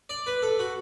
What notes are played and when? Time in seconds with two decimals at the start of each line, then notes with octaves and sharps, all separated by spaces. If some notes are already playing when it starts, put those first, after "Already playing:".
0.10 D5
0.27 B4
0.42 A4
0.59 F#4